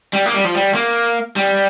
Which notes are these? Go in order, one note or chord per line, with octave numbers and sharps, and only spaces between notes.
G3
A#3
G3
F3
G3
A#3
G3